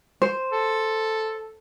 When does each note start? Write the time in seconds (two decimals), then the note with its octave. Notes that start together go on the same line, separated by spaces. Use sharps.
0.22 C5
0.52 A4